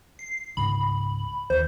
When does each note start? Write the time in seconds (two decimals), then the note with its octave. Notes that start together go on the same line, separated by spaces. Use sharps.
0.19 C7
0.57 C#2 G#2 C#3 B5
1.50 D#2 C5